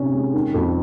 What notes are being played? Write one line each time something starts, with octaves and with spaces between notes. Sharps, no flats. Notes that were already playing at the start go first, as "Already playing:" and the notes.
Already playing: C3 D#3 C#4
G#3
D#3
F2